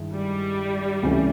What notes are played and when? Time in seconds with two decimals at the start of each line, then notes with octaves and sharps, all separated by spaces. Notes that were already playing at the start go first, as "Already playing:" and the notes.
Already playing: G2 D#3 G#3 E4
0.13 G3
1.02 C#2 C3 E3 A3 C#4